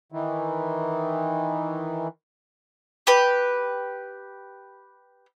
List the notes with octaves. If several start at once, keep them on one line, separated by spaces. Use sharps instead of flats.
D#3 E3
G4 B4